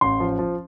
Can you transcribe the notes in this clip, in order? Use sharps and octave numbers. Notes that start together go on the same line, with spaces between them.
A1 C6
F3
F3